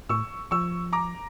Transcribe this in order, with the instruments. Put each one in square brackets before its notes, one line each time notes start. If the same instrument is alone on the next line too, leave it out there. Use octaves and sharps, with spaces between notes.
[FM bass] A2 [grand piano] C#6 E6
[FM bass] F3 [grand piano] C#6 E6
[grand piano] A#5 D6